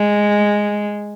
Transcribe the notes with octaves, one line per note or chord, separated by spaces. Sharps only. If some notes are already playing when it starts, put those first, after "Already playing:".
Already playing: G#3